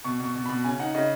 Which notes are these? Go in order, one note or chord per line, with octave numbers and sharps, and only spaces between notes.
B2 C#6
B2 C#6
B2
B2 B5
C#3 G#5
D#4 F#5
C#3 D#5